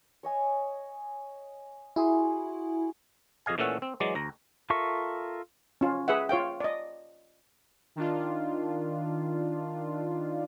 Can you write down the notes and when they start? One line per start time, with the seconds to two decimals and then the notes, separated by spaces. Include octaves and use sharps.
0.23 C#5 D#5 G#5
1.96 E4 F#4 G#4 C6
3.46 F2 G#4 D#5 F5 G#5
3.58 A#2 E3 A3 C#4 A4 F#5
3.82 C4
4.00 E3 F#3 G#3 D5
4.15 D2 A#5
4.70 F4 A4 A#4 E5 C#6
5.81 C#4 F4
6.08 G#4 B4 E5 F#5
6.29 F4 C#5 F5 G5
6.60 D5 D#5
7.96 D#3 D4 F4